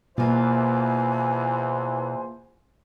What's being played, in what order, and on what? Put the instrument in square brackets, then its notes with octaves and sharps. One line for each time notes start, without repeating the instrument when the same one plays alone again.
[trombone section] E2 E3 C5 [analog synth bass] B2 [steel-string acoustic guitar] A#3 F4 [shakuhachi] G#5